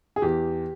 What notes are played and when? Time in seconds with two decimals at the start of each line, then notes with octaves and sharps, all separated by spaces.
0.16 G#4
0.22 E2 G4